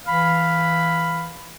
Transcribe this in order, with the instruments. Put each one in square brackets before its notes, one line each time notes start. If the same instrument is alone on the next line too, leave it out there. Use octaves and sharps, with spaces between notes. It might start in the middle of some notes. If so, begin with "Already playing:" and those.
[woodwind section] E3 F5 B5